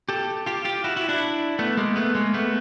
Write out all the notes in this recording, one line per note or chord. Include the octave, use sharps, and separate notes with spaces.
G4 A4
F4 G4
F4 G4
E4 F#4
E4 F#4
D4 E4
A3 B3
G#3 A#3
A3 B3
G#3 A#3
A3 B3